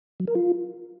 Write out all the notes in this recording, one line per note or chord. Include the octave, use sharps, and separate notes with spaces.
F#3
A#4
F4